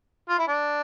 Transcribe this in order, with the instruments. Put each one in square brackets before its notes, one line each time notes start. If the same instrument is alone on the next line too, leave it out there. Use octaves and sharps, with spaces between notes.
[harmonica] F4
E4
D4